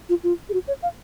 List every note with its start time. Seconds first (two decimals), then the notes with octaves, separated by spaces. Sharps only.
0.09 F4
0.24 F4
0.49 G#4
0.53 F#4
0.68 C#5
0.82 F5